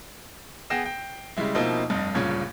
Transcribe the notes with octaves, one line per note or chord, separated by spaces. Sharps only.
B3 G#4 G5 A#6 C7 E7
G5
C#3 G3 G#3 E4
B2 F3 A#3 C4 D#4 E4
F1 G2 D#5
D1 G2 A#2 C#3 C#4 G#6